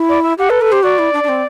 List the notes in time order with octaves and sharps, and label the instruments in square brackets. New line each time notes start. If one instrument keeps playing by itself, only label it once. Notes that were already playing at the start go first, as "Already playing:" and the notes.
Already playing: [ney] E4
[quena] D5
E5
[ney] G4 [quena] F#5
[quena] A4 [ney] B4
[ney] A4 [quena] B4
[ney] G4 [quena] C5
[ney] F#4 [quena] D5
[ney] E4
D4
D4
C4